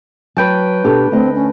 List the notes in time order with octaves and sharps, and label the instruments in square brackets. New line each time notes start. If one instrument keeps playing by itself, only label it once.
[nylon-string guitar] F#3 [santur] B4 G5 A5
[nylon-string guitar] B2 G4 A4 [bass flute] D4
[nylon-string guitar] D2 D#5 [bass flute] C4
[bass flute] C#4